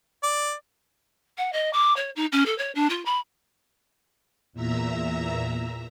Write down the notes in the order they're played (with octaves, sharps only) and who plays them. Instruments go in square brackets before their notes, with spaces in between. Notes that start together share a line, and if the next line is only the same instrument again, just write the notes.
[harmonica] D5
[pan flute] F#5
D#5
D6
C#5
D#4
C#4
A4
C#5
D4
F4
B5
[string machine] E2 A#2 E5 A#5 E6